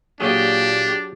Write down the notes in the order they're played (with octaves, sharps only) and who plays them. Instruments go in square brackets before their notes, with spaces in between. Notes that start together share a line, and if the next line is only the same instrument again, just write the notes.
[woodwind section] A#2 A#3 [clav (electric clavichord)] F#3 G#4 [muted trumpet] D4 [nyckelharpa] G4